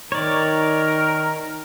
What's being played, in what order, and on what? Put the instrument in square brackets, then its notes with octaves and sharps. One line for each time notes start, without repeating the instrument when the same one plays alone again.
[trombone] D#3 [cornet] A#4 [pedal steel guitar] C#5 D5